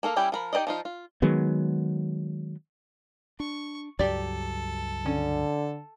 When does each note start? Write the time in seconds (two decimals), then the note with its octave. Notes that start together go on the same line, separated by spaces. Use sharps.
0.03 A#3 A4 A#4 F5
0.16 G3 C#4 E4 G4
0.32 F3 A#4 B5
0.53 D#4 G4 B4 D5 D#5
0.67 F3 D#4 F4
0.85 F4
1.22 D#3 F#3 G#3 B3
3.40 D4 C#6
3.99 C#2 G2 F#3 G4 A4 D5
5.06 D3 C#4